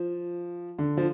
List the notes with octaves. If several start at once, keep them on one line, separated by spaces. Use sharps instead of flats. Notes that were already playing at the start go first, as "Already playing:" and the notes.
Already playing: F3
D3
F3